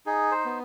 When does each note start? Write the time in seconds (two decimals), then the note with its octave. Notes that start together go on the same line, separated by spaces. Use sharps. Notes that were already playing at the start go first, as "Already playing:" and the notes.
0.06 D#4 G#4
0.31 C5
0.45 B3